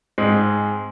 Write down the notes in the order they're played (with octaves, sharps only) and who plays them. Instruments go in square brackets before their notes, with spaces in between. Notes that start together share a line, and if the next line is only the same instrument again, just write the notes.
[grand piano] G#2 G#3 C4 G#4